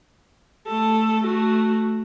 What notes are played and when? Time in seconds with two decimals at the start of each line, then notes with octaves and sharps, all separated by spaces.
0.67 A3 A4
1.24 A3 F#4